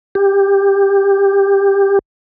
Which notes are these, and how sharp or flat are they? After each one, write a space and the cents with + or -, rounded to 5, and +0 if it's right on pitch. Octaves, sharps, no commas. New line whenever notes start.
G4 +15